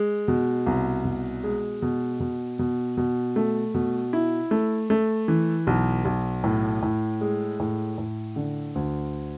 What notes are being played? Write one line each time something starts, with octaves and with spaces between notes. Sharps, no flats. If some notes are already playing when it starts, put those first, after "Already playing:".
Already playing: G#3
B2
C2
B2
G#3
B2
B2
B2
B2
A3
B2
E4
A3
A3
E3
B1
B1
A2
A2
G#3
A2
A2
D3
D2